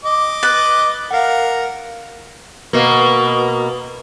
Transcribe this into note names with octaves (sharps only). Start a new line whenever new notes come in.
D#5 D6
B4 A6
A#4 F5 F#5
B2 A#3